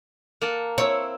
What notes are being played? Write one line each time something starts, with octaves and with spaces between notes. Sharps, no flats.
A#3 F#5 A5
C4 E4 C#5